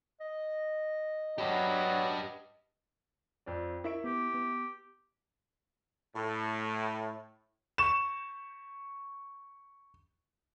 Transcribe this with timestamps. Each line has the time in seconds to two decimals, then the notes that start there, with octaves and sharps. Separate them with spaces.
0.21 D#5
1.38 F#3 B3 D4 G4 B4
3.46 F2 C4 D5
3.84 E4 A#4 E5 C#6 D7
4.04 B3 G4
4.34 B3
6.16 A2
7.78 C#6 E7